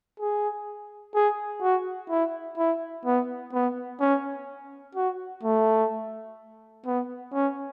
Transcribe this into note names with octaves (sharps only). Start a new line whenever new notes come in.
G#4
G#4
F#4
E4
E4
B3
B3
C#4
F#4
A3
B3
C#4